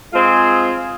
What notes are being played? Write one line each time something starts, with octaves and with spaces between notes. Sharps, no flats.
G#3 C4 F4 G#4